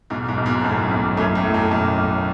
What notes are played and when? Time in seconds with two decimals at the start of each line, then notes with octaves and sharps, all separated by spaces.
0.10 B1 G#2 B2
0.28 G#2 B2
0.37 B1
0.46 G#2 B2
0.64 B1 F#2 A2
0.91 B1
1.17 F#2 A2 A3
1.35 F#2 A2
1.45 A3
1.54 F#2
1.71 B1 F#2
1.98 B1